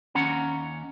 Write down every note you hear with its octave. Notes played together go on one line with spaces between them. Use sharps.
D#2 C#4 F#5 A#5